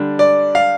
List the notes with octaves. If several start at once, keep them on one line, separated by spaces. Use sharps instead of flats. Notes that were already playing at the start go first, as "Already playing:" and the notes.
Already playing: D3 G3 D4
D5
F5